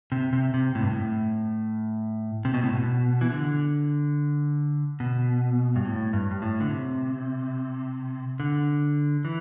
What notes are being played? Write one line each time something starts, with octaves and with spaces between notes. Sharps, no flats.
C3
C3
C3
A2
G2
A2
C3
B2
A2
B2
E3
D3
B2
G2
A2
G2
G2
A2
D3
C3
D3
E3